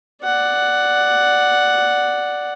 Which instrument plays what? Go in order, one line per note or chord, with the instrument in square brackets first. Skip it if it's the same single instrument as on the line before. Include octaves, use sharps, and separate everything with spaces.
[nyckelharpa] D5 F#5